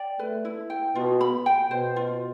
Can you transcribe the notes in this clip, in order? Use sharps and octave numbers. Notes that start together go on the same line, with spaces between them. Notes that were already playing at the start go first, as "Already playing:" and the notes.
Already playing: D5 G5
A3 B4
E4
G5
B2 F4
B5
G5
B2 C5
F4